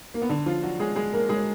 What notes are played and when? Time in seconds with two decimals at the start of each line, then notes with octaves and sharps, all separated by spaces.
0.14 A#3
0.22 B3
0.29 D3 D4
0.46 F3 F4
0.63 F#3 F#4
0.79 G#3 G#4
0.96 G#3 G#4
1.13 A#3 A#4
1.29 G#3 G#4